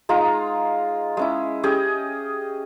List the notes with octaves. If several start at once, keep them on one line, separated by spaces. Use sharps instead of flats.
G#3 D#4 F4 A#5
G#3 C#4 E4
C#4 G4 G#4 D#5